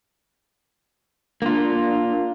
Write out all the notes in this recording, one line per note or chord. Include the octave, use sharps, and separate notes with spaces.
A#3 D4 F4